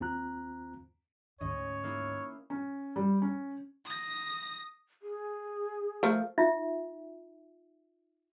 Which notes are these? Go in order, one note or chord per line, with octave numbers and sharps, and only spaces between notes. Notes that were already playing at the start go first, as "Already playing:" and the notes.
D#2 C4 F4 A#5 F#6
D2 G#2 C#4 C#5 D#5
A#3 D#4 E4
C#4
G3
C#4
D#6 A#6
G#4
F3 A3 A#4
D#4 F4 E5